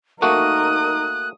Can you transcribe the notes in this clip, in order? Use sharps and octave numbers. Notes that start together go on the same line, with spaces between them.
A3 A#3 D#4 F#4 A#4 D#6 F#6